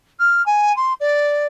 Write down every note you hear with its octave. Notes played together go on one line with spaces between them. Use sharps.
F6
G#5
C6
D5